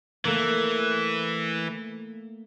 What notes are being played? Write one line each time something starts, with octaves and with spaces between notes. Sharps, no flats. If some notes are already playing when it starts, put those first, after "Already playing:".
E3 A3 A#3